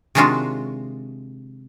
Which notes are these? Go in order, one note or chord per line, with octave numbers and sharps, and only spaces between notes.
C3 D#3 G#3 D4 F4 F#4